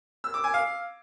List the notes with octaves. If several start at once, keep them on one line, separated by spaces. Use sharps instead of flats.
E6
D6
G#5
F5